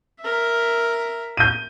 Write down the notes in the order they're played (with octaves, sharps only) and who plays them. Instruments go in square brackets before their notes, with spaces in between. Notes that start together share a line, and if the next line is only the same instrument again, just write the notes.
[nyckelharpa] A#4 E5
[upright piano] G6 D#7